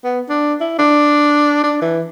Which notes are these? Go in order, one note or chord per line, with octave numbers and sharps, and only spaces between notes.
B3
D4
E4
D4
D4
E3